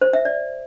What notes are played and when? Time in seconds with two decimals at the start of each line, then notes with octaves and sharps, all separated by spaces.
0.01 C5
0.13 E5
0.25 D5